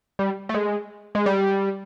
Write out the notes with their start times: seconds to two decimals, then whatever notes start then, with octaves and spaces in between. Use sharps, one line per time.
0.19 G3
0.49 A3
0.54 G#3
1.15 G#3
1.26 G3